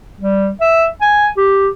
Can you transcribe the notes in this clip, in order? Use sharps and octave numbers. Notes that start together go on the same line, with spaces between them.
G3
E5
G#5
G4